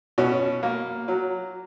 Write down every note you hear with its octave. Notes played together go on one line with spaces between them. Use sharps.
B2 C#4
A#3
F#3